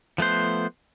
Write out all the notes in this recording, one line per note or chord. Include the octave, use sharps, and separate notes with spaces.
F3 A3 B3 C5